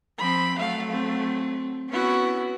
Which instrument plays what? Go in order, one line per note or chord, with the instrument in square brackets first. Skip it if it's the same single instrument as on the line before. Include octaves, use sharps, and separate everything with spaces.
[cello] F3 C4 [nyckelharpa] B5
[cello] F#3 A3 [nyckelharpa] F5
[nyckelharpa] C4
[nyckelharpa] B3 F#4 [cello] C#4 E4